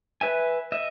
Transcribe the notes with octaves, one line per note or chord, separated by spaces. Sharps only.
B4 E5 G#5
D#5 E5